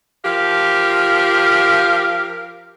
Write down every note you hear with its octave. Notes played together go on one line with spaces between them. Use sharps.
F3 G4 A#4 F5